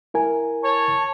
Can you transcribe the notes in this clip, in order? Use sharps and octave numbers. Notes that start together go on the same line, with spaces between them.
E4 A#4 G#5
C#5 A5